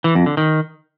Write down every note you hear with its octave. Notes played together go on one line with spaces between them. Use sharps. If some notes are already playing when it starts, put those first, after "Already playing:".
E3
F2
D3
D#3